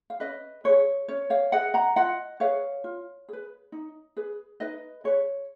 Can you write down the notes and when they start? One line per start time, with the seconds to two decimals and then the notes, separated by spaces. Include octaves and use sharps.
0.10 F5
0.20 C#4 B4 D#5
0.64 G#4 B4 C#5
1.08 C#4 C#5
1.30 C#5 F5
1.52 G#4 B4 D#5 F#5
1.74 F#5 A#5
1.96 F4 D#5 F#5
2.40 G#4 B4 C#5 F5
2.84 F4
3.29 G#4 B4
3.72 D#4
4.17 G#4 B4
4.60 D#4 B4 D#5
5.04 G#4 B4 C#5